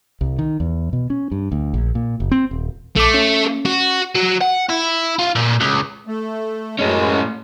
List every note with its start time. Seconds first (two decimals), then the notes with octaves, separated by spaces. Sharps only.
0.21 C2
0.39 D#3
0.60 E2
0.93 B2
1.10 C#4
1.32 G2
1.52 D2
1.74 A#1
1.95 A#2
2.20 F#1
2.31 C4
2.51 D#1
2.96 A#1 A3 D6
3.14 C#4
3.66 F#4
4.15 F#3
4.41 F#5
4.70 E4
5.19 F4
5.36 A#2
5.61 C#2
6.07 A3
6.79 F#2 A2 G#3 C#4